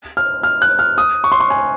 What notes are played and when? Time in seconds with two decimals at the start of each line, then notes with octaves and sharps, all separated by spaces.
0.17 F6
0.43 F6
0.62 F#6
0.79 F6
0.98 D#6
1.24 C#6
1.32 C6
1.40 C#6
1.50 G#5